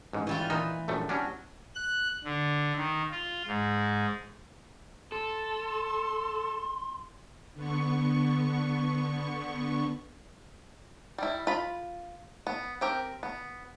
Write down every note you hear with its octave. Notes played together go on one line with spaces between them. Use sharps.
A1 G#2
E3 G3 F4
A#2 E3 D#4
A#1 F#2 A3
F#3 G3 C#4 D4
F#6
D3
D#3
F4
G#2
A4 C6
D3 B3 C#6
G3 E4
F4 B5
B3
C4 G4 A#4
B3